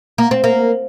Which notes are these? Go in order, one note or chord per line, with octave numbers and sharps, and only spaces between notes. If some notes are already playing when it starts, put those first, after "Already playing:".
A#3
C4
A#3